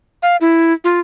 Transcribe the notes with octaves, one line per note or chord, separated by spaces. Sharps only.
F5
E4
F4